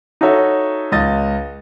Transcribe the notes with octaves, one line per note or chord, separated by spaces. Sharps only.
D#4 F#4 A4 C#5 E5
C#2 D#5 A6